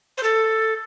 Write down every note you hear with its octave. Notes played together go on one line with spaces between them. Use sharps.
C5
A4